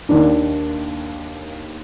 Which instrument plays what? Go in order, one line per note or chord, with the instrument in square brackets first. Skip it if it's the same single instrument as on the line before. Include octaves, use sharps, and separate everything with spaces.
[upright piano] D#2 D#3 A#3 D4